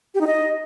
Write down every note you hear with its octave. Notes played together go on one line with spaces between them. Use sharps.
G4
D#4
D#5